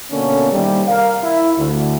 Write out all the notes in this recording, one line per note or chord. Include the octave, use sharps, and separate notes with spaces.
B2 D3 A#3 C#4 A4
D#2 C3 G3
A#4 F5
E4
D2